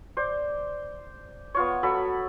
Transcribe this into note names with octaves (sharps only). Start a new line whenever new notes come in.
C5 D5
B3 F4 C#5
F#3 A4 B5